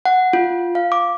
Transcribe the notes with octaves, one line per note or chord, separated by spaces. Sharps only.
F#5
F4
F5
D6